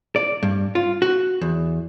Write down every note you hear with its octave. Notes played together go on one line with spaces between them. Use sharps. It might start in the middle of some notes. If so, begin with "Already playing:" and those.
D5
G2
F4
F#4
E2